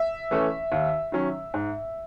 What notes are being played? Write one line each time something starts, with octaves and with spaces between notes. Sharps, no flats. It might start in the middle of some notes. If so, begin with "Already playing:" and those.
Already playing: E5
E3 A3 C#4
D#2
D#3 F#3 C#4
G#2